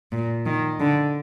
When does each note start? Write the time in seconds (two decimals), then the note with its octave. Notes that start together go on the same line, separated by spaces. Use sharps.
0.12 A#2
0.46 D#3
0.80 D3